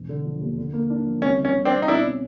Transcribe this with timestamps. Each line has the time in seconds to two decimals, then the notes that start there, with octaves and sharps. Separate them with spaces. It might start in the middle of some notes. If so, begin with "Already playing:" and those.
Already playing: E1
0.09 D3
0.25 F3
0.41 D#2
0.57 D3
0.73 A#3
0.90 D4
1.06 F3
1.22 C2 C#4
1.39 D#3
1.45 C#4
1.55 C2
1.65 C4 D4
1.71 C3
1.82 D#4
1.88 B2 D4 E4
2.04 C#4